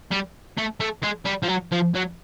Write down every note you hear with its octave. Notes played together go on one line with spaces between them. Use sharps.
G3
A3
A3
G#3
G3
F3
F#3
F3
F#3